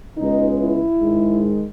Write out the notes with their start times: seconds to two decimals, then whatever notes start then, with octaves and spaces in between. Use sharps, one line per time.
0.17 C#2 C#3 G#3 B3 D#4
0.57 E4
0.99 G#2 D#3 G#3